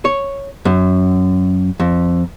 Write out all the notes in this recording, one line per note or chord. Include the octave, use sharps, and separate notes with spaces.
C#5
F#2
F2